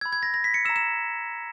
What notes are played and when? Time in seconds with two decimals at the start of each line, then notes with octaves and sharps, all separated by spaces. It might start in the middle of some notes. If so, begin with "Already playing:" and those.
0.01 B5 E6 G#6
0.13 G#6
0.23 A#6
0.34 A#6
0.44 B6
0.54 C#7
0.65 E6 E7
0.69 A#5
0.76 E7